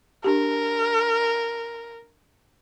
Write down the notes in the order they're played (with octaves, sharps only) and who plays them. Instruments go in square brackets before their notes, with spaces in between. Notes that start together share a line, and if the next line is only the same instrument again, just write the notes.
[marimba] D4 G4 [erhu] A#4